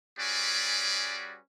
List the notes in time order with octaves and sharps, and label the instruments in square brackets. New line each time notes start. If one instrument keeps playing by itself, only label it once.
[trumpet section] G3 C#4 F#4 G#4 B4 D5